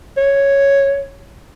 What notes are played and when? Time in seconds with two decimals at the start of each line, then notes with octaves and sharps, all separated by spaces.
0.17 C#5